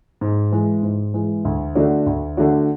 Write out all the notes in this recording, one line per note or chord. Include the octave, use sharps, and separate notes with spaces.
G#2
E3 G#3
G#2
E3 G#3
D2
D3 A3 D4 F#4
D2
D3 A3 D4 F#4